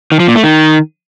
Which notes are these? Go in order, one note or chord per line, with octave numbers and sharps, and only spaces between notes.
D#3
F3
A#2
A3
D#3